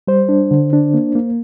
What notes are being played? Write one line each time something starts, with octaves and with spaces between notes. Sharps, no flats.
G3 C5
D4
D3
D4
A#3
A#3